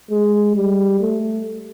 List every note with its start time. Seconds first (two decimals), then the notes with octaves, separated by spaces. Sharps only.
0.10 G#3
0.55 G3
1.00 A3